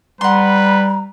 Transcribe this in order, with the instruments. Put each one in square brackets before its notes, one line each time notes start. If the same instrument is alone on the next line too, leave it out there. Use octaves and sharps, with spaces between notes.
[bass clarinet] G3 [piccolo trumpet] B4 [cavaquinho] F#5 C6 [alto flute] A#5